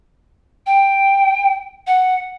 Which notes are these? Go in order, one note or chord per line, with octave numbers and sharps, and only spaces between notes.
G5
F#5